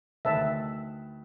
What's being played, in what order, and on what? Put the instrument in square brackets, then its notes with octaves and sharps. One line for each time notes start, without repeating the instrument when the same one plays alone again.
[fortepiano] D2 D#3 B4 [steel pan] E5 A5